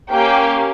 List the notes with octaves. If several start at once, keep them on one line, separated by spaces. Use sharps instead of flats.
A#3 C#4 G4 G5